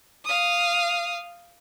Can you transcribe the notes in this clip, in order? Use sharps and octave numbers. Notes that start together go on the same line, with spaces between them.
F5 D#6